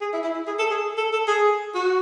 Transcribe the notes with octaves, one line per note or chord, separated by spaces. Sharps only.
G#4
E4
E4
E4
G#4
A4
G#4
A4
A4
G#4
F#4